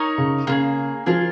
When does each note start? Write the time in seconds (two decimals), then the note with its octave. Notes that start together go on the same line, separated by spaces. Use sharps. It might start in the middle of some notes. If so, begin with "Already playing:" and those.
Already playing: D#4 A#4 C#5
0.18 C#3
0.47 C#3 A#3 F4 G#4
1.06 F3 A#3 F4 G#4